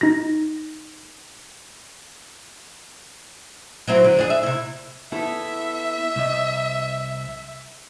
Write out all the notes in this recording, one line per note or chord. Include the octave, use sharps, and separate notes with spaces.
D#4 A#6
F#3 C4 E4
D3
F2 D4 G#4
E5
C3 E4
B3 E4 A4 E5
C2 D#5